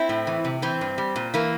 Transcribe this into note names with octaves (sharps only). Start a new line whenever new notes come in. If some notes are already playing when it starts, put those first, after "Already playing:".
Already playing: C4 E4
A2
E3
C3
E3 C4
G2
G3
A#2
E3 A#3